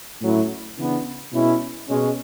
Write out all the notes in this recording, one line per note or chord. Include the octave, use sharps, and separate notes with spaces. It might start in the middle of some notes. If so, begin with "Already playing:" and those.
A2 F#3 C#4 E4
C#3 E3 B3 D4
B2 G#3 C#4 E4
B2 G#3 C#4